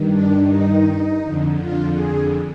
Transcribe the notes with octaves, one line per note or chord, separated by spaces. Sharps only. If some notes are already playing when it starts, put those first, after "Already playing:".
Already playing: G2 D#3
D4
D#4
F2 D3
F4
G#4